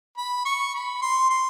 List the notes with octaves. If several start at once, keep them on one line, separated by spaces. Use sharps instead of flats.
B5
C#6
B5
C6
C6